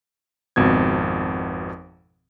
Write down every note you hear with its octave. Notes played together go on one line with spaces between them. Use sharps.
G#1 F2 B2 G#6